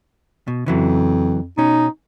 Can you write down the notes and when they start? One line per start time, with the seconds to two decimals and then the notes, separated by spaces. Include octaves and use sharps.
0.48 B2
0.66 F2 C#3 E3 F#3
1.58 B2 C#4 D#4